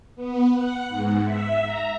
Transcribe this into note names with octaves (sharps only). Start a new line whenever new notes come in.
B3
F#5
G#2
E5
A#5